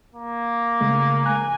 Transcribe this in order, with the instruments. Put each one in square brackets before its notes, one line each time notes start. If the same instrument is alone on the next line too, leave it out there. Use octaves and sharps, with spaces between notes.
[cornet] A#3
[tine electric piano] C#3 G#3 A3
[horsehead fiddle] G#5 [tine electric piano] A#5 F#6